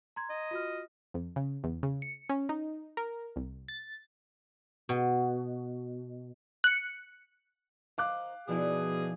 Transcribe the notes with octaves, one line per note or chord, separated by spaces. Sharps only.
A#5 C6 G#6
D#5
F4 F#4 F6
F2
C#3
E2
C#3
C#7
C#4
D#4
A#4
C2
A6
B2
F#6 C#7
D#3 D#4 C5 F5 D6 F#6
B2 F3 D#4 E4 G#4 D5